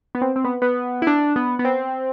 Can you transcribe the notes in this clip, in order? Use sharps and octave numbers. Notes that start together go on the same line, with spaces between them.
B3
C4
C4
B3
B3
E4
D4
B3
B3
C4